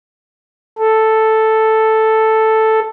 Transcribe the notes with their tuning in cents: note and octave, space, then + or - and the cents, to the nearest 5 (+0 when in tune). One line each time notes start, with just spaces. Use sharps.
A4 +0